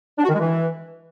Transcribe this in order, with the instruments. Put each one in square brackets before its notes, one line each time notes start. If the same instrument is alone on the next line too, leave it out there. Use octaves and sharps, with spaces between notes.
[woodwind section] D4
F#4
D#3
G#3
E3